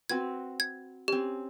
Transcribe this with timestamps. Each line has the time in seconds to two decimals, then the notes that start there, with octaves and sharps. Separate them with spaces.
0.10 C4 F#4 B4 G#6
0.60 G#6
1.08 C4 C#4 G4